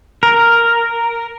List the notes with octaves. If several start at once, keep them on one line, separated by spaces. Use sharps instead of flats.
A#4